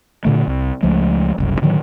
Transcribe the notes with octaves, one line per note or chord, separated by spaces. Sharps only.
A#2 D3 A3
C2
C#2 F3 G#3 A3
F#1 C2 F#2
A2 D3 D#3 F#3